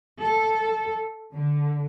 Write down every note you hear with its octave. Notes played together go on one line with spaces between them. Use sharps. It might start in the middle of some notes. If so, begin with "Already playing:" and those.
A4
D3